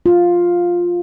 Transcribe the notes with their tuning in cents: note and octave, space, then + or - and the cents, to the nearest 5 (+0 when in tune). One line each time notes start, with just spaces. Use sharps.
F4 +5